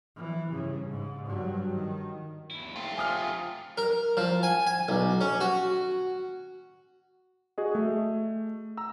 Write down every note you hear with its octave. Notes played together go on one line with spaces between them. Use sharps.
E3
G2 C#3
G#2
G2 F#3
D#3
D#2 E4
A3 C4 F4
G#5 D#6 F6
A#4
F3
G#5
G#5
B1
C#4
F#4
F#4 G#4 D#5
A3
A#5 E6